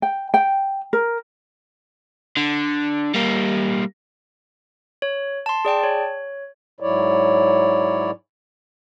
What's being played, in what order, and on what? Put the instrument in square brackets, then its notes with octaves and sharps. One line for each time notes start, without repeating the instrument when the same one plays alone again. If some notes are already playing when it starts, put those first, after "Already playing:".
[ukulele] G5
G5
A#4
[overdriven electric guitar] D3
G3 A#3
[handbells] C#5
A5 C6
G#4 D5 G5 A5
C#5
[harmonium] G#2 F#3 E4 C#5 D5